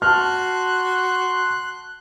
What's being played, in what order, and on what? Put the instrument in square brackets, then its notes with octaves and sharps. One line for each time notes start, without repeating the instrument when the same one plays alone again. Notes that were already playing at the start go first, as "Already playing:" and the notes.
[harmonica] F#4 [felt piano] A5 F6 [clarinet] C6 [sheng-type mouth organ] F#6